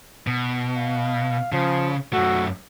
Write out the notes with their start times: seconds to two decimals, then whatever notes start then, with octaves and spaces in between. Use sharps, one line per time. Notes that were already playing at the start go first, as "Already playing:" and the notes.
0.27 B2
0.76 F5
1.52 C#3 F3
2.13 F#2 A3 F#4